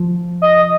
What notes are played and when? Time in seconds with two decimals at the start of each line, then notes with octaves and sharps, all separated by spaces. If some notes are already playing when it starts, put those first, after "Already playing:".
Already playing: F3
0.42 D#5